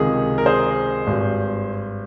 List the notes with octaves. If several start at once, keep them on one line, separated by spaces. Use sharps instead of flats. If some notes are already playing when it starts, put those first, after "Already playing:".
Already playing: C#2 C3 D#3 G#4
A#4
G#4 C5
G#1 G2 G3